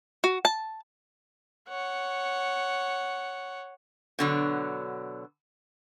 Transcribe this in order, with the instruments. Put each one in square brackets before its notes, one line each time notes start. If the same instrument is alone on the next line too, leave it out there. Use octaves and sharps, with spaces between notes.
[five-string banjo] F#4
A5
[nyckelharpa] C#5 F#5
[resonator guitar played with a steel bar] B2 D3 F#3